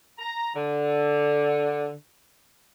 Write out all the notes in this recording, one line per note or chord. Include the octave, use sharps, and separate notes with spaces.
A#5
D3